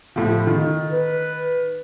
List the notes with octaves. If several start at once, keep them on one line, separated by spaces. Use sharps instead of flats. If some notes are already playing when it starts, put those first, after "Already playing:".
A2 F3
D#3
B4